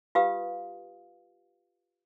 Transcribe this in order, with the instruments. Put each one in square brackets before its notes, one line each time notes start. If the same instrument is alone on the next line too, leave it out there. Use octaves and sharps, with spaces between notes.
[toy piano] F4 G4 B4 F5 D#6